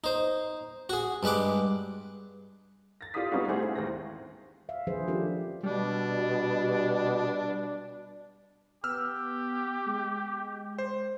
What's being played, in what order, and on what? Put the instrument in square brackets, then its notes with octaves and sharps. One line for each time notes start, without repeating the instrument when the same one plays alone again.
[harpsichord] D#4 C5
F#4 G#4
G2 G#3 B4 B5 D6
[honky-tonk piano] A6 A#6
F4 G4 D5 F5 D#6 B6
G3 B3 C#4 D#4 F4 F#4
A3 G4 G#4 C5 F5 F#5
D#4 E4 G#4
D#2 G#3 C5 A#6
[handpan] E5 F5
D#3 F3 D4 G#4 B4 C5
C#4 D4 F4 G4 A4 A#4
[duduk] B2 [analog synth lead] G3 [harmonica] D4
[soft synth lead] B3 [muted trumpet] G4 [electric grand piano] E6 F6
[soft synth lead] G#3
[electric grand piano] C5